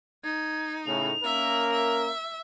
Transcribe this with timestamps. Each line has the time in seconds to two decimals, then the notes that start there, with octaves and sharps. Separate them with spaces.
0.24 D#4 G#6
0.86 A2 C#3 F7
1.24 A#3 C#4 A#4 E5
1.72 E5